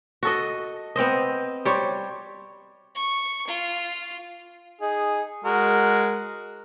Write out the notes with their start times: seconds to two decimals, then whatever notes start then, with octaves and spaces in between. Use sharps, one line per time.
0.23 F#4 A4 D#5
0.96 B3 C4 C5 D#5
1.65 G3 C5 C#5
2.95 C#6
3.48 F4
4.81 D#4 G#4
5.45 G#3 F#4 A#4